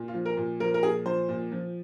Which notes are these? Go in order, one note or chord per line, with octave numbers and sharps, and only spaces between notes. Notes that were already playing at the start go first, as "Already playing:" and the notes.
Already playing: A#2
F4
F3
A#4
A#2
F3 A#4
A#4
A#2 G#4
F3 C5
A#2
F3